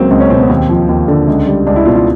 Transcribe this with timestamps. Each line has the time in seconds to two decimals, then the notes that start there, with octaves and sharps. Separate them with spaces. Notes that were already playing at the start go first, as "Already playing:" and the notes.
Already playing: C#2 F#3 A#3 C4
0.11 C#2 C4
0.20 C#4
0.30 B2 C4
0.40 B3
0.50 D#2 C4
0.69 F3
0.89 D#2
1.08 D3
1.27 C#2
1.47 G3
1.66 C#2 D4
1.76 E4
1.86 B2 F4
1.96 F4